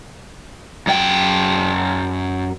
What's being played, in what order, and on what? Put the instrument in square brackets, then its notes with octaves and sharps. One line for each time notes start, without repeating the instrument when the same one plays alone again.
[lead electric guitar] F#2 G5